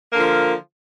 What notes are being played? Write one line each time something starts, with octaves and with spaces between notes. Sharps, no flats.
D3 F3 A#3